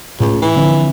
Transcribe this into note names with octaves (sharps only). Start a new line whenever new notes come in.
C#2 A2 A3
E3
D3 F3 C4